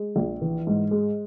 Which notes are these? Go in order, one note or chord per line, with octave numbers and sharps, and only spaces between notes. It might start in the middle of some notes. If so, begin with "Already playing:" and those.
Already playing: G#3
A#1
E3
G#2
G#3